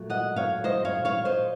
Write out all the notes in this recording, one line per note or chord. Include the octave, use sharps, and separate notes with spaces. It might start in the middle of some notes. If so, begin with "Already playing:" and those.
Already playing: A#2 F#3 A3
D#5 F#5
C#5 F5
C5 D#5
C#5 F5
C#5 F5
C5 D#5